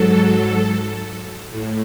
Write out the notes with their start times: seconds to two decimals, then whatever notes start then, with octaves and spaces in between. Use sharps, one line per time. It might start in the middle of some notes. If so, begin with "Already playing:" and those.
Already playing: G#2 F#3 A4
1.50 A2